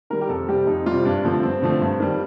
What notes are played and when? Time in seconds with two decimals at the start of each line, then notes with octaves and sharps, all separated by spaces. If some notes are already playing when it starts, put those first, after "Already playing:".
0.10 D#3 G3 A#4
0.21 G4
0.29 F2 A4
0.49 C3 G3 G4
0.67 F2 D#4
0.86 C3 G3 F4
1.05 G2 D4
1.24 D3 F3 A3 C4
1.43 G2 C4
1.62 D3 F3 A3
1.81 G2
2.00 D#3 G3